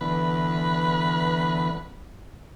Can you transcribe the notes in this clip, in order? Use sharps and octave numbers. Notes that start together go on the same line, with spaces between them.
D3 E3 B3 B4